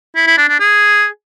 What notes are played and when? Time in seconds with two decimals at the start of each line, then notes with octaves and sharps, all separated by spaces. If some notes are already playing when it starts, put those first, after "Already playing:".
0.16 E4
0.27 E4
0.38 D4
0.49 D4
0.60 G#4